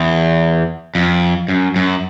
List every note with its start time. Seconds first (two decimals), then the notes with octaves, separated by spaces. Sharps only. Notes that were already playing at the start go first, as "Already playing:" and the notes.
Already playing: E2
0.95 F2
1.48 F#2
1.76 F#2